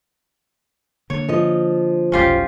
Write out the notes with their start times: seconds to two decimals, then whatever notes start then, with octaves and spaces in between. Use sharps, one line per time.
1.10 D3 A#3 C#5
1.28 F3 D#5
2.12 F1 B1 C#4 F4 G4